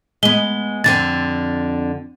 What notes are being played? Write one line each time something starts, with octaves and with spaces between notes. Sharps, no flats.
G#3 B3 G7
F2 D3 C4 A6